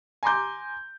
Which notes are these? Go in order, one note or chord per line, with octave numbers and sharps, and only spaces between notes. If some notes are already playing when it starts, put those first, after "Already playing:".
G#5 A#5 C6 D6 G6